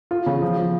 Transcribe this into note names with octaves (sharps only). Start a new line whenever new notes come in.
F4
C#3
F3
F3